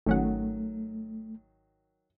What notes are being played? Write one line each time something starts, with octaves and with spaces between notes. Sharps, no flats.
G#1 D#3 F#3 A3 C#4 F#5